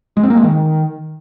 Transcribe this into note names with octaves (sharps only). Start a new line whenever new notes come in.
G#3
C4
A#3
G#3
D#3